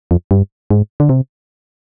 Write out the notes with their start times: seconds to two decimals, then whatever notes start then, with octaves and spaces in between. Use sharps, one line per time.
0.11 F2
0.31 G2
0.71 G#2
1.00 D3
1.09 C3